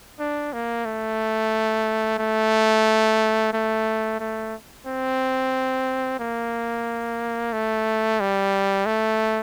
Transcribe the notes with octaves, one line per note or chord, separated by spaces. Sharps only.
D4
A#3
A3
A3
A3
A3
C4
A#3
A3
G3
A3